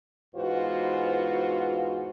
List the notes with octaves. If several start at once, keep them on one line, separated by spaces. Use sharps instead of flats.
E2 G#2 F4 F#4 B4 C5